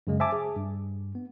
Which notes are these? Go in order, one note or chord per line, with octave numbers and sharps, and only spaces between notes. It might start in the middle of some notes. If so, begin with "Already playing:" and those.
F#2 C#3 G#3
C5 E5 G#5 A5 D6
G#4
G2
B3